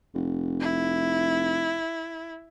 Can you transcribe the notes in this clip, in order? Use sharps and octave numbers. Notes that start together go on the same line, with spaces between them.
F1
E4